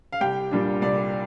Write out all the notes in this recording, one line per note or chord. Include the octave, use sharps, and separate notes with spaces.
F5
C2 G4 G5
A#2 G3 D4
C2 D5